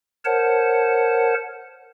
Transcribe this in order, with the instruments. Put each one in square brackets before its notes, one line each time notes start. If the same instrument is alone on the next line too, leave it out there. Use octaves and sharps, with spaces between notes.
[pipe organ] A#4 C5 C#5 F#5 A5